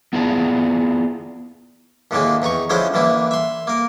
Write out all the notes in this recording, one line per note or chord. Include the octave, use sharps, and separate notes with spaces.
B3 E4 F4 G#4 D5 A5
D#2 A2 D3 D#3 G#3 A#3
E2 D#4 A#5 C#6
D3 F3 G#3 C#4 E4 C5
A1 D3 E3 A#3 E4
E5 C6
A#3 A#4